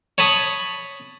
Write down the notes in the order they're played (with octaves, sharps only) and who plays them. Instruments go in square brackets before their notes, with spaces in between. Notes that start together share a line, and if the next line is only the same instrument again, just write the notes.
[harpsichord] C#5 A5 B5 D#6